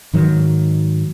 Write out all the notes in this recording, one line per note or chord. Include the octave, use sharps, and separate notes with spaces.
G#2 D#3 F#3